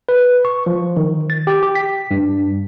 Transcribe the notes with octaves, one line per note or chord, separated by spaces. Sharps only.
B4
C#6
F3
D#3
A6
G4
G4
B6
G2